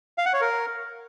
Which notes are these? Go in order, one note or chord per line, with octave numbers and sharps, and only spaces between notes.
F5
F#5
C#5
A#4